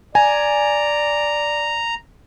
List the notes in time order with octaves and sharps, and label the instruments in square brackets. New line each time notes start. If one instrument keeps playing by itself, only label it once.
[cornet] D5 [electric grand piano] G#5 [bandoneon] A#5